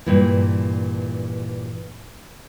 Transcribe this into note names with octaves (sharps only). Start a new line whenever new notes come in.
G2 A#2 E3